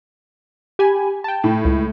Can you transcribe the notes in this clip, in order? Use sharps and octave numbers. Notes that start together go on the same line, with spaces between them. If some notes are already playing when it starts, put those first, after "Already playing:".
G4 G#5 B5
G5 A5
A2
C#2